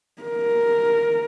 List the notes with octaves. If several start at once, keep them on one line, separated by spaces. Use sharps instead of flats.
A#4